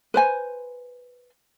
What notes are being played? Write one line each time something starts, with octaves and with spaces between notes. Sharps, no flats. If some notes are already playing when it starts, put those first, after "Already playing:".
B4 C5 G#5